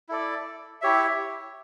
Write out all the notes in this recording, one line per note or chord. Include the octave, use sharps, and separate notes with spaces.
E4 A4 D5
E4 G4 C#5 E5